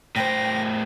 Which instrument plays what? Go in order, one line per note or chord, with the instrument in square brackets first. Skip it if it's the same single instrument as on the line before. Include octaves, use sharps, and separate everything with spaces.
[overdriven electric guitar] A2 C5 [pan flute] G5 [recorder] A#6